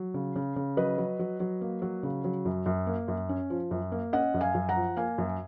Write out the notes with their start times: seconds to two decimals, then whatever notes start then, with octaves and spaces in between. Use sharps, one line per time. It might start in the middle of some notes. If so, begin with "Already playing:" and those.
Already playing: F#3
0.14 C#3
0.36 C#3
0.56 C#3
0.77 F#3 B4 D#5
0.98 F#3
1.19 F#3
1.40 F#3
1.61 A#3
1.82 F#3
2.03 C#3
2.24 F#3
2.45 F#2
2.66 F#2
2.87 A#3
3.08 F#2
3.29 C#4
3.50 F3
3.71 F#2
3.92 A#3
4.13 C#4 D#5 F#5
4.34 F#2
4.41 F5 G#5
4.55 F#2
4.69 F#5 A#5
4.76 F3
4.97 A#3 F5 G#5
5.18 F#2